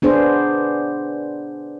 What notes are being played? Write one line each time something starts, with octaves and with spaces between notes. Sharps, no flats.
B3 D4 G#4 C5